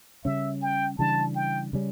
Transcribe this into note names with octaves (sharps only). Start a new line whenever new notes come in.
C#3 G3 C#4 E5
G5
C#3 E3 G3 D4 A5
G5
C#3 G3 C#4